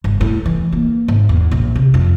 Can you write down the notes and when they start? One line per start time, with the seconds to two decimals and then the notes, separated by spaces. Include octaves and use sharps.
0.04 G1
0.21 A2
0.46 E3
0.72 A#3
1.08 G#1
1.29 E2
1.51 A#1
1.76 C3
1.94 F2